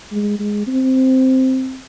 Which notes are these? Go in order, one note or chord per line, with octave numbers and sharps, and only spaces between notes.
G#3
G#3
C4